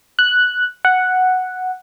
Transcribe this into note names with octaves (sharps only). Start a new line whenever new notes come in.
F#6
F#5